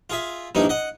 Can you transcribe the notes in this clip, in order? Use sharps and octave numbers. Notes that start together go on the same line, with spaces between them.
F4 G#4 E5
A#1 G2 D#4 E4
D#5 F#5